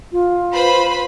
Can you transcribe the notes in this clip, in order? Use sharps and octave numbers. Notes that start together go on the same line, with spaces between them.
F4
B4 C5 B5